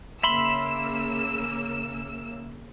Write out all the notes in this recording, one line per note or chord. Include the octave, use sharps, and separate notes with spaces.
C#3 A#3 E5 B5 C6 E6